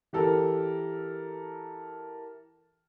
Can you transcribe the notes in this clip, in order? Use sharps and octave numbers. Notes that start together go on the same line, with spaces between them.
E3 G4 A4 A#4